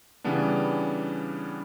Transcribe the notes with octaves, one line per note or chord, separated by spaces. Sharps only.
C#3 E3 G3 B3 C#4 D4